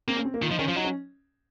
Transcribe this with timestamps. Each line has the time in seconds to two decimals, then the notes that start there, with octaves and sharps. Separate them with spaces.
0.08 A#3 C4
0.17 C#4
0.25 C4
0.34 A#3
0.42 D#3 F4
0.50 F3 D#4
0.59 D#3 C#4
0.67 F3 F4
0.76 F#3 D#4
0.85 C#4